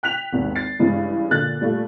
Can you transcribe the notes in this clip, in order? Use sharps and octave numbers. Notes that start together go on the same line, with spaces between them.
G5 F#6 B6 F7
G#1 D#2
A6 C7
G2 C#3 E3 G#3
A#2 D3 F#6 A6
A#2 G3 A3 F4